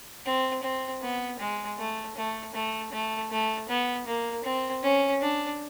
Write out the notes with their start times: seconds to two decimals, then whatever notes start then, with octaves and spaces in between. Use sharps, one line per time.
0.26 C4
0.63 C4
1.02 B3
1.40 G#3
1.78 A3
2.16 A3
2.54 A3
2.92 A3
3.31 A3
3.69 B3
4.07 A#3
4.45 C4
4.83 C#4
5.22 D4